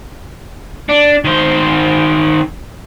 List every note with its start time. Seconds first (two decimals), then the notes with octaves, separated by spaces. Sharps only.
0.89 D4
1.24 D#3 C5